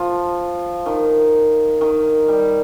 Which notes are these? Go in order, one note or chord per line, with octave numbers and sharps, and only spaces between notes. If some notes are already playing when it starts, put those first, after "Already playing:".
Already playing: F3
D#3
D#3
G3